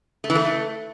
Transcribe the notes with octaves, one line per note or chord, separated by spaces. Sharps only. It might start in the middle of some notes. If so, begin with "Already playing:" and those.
A3
E3
A3